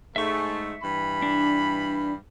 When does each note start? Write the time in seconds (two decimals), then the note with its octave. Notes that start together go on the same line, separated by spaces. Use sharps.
0.16 G#2 G#3 A3 E5 C#6
0.83 G2 E3 B5
1.22 D4